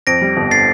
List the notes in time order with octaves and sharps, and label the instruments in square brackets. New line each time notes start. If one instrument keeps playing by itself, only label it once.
[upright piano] F2 [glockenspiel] A#6 D7
[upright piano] G3
G1
[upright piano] D3 [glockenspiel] A6 C7